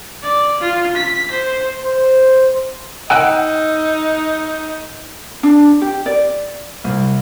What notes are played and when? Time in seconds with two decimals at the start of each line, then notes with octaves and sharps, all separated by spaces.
0.22 D5
0.60 F4
0.96 B6
1.31 C5
1.83 C5
3.10 D#4 F#5 G5 E6 F#6
5.43 D4
5.81 G4
6.06 D5
6.84 C2